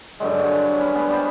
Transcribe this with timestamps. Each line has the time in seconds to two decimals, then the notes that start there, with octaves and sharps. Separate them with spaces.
0.20 G2 D3 F#3 G#3
0.46 C#5
0.79 C#4 B4
0.95 B3
1.08 G3 C5